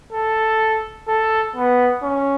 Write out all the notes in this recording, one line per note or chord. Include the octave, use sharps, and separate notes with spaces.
A4
A4
B3
C#4